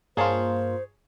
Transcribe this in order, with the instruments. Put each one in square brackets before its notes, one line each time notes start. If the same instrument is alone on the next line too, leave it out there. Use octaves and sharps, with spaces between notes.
[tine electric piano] G2 [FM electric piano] A#3 F4 [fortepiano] G#4 C#5 A5 [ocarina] C5